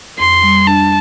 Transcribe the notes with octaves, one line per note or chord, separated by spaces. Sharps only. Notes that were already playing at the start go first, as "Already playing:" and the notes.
F2 C6
G3
D4 A5